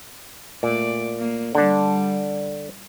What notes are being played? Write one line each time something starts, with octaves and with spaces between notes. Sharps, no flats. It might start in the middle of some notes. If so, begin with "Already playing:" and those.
A#2 A3 D5
A#3
D3 G3 D4